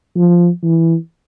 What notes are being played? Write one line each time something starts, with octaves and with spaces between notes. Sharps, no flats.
F3
E3